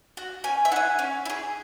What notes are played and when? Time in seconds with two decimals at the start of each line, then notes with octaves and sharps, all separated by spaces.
0.17 F#4
0.44 C#4 G#5
0.65 E5
0.72 E4 F#5
0.76 G#4
0.99 C#4
1.25 E4
1.30 G#4